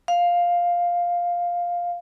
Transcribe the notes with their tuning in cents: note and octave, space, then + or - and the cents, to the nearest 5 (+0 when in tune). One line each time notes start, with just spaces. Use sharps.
F5 +5